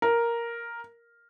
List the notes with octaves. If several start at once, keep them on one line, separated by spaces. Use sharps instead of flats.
A#4